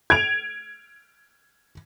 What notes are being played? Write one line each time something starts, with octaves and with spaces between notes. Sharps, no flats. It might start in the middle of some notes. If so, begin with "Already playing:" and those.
G#6 D7 F7